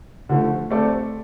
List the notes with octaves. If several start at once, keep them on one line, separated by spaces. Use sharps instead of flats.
D3 F3 A3
A3 C4 A4 D5